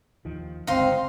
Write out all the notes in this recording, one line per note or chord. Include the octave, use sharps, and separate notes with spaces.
D#2 D#3 F3
G1 C#2 C4 D#4 F5 C6